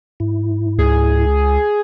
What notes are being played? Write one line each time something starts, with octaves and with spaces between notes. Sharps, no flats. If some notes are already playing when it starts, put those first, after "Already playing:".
G#2 E4
C#2 G#4